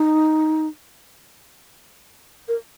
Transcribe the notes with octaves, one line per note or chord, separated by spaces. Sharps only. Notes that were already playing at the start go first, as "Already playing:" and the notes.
Already playing: D#4
A#4